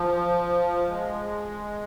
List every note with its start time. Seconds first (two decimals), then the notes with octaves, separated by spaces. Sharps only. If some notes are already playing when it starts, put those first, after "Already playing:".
Already playing: F3
0.88 G#3